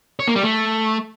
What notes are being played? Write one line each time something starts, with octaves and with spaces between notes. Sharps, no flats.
C#5
A#3
G3
A3